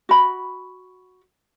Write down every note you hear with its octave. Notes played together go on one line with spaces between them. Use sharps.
F#4 B5